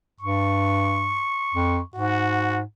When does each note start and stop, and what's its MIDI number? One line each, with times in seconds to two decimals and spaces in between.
0.20 1.23 43
0.20 1.89 85
1.54 1.79 41
1.94 2.63 44
1.94 2.59 66